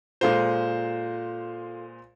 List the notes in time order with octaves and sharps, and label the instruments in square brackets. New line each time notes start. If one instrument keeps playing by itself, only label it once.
[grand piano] A#2 G#3 C5 [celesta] F4 A4 F5